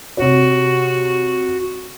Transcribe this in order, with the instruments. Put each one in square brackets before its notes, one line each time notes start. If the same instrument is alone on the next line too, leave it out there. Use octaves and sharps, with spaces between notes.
[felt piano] C3 C#5 [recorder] F#4